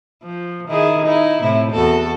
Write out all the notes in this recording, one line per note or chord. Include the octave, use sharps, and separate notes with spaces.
F3
D#3 E4 G#4
D#4 E4
A2 C3 E4
E2 F#4 A4